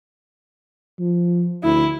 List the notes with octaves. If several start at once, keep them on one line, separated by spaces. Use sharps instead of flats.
F3
D2 E4